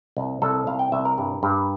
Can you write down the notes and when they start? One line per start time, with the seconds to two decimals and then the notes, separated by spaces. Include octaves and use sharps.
0.17 C2
0.42 C2 A4
0.67 C2 F5
0.79 G5
0.92 C2 E5
1.05 A#4
1.18 G2
1.43 G2